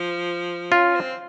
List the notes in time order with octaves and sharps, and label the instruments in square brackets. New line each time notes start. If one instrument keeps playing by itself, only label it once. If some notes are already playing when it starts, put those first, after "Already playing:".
Already playing: [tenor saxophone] F3
[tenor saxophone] C#4 [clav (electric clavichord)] F4
[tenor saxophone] C4